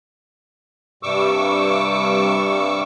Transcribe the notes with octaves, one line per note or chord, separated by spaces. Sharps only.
G2 C3 G3 C#6 D6 E6